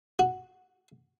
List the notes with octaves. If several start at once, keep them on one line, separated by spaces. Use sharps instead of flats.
F#4